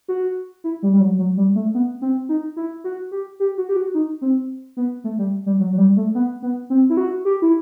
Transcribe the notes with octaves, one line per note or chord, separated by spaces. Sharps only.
F#4
E4
G3
G3
F#3
F#3
G3
A3
B3
C4
D#4
E4
F#4
G4
G4
F#4
G4
F#4
D#4
C4
B3
A3
G3
G3
F#3
F#3
G3
A3
B3
B3
C4
E4
F#4
G4
E4